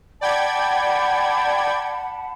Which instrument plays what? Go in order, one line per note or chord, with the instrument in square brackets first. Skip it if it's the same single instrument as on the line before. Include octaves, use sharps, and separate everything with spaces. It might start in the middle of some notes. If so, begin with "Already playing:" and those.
[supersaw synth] D5 G5 G#6 [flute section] F#5 A5 B5